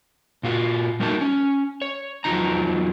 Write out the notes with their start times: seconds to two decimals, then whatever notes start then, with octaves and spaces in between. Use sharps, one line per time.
0.43 A#2 F4 F#4
1.00 G3 A3 A#3 D#4 F#4 A5
1.21 C#4
1.82 C#5
2.24 E2 F3 F#3 D#4 A#5